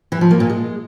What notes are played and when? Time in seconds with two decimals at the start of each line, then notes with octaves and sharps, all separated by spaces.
0.12 E3
0.21 F3
0.31 A#3
0.40 A#2
0.50 G#3